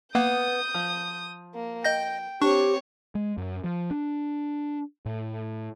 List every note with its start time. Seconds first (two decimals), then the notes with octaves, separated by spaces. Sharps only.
0.15 A#3 B3 D#6 G6
0.74 F3
1.54 A#3
1.84 D#5 G5 G6 A#6
2.42 C4 D4 G4 C#5 C#6
3.15 G#3
3.38 F#2
3.64 F3
3.91 D4
5.06 A2